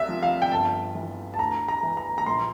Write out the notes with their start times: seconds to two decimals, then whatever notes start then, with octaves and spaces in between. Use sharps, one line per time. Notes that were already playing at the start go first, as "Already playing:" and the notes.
Already playing: C2 E5
0.09 F3
0.23 F5
0.42 G5
0.52 G1 A5
0.95 E3
1.34 A5
1.39 D2 A#5
1.68 A#5
1.83 E3
1.97 A#5
2.18 A#5
2.26 A#1 C6